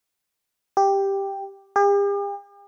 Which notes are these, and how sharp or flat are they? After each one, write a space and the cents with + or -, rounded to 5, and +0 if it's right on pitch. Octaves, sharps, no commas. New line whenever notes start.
G4 +5
G4 +45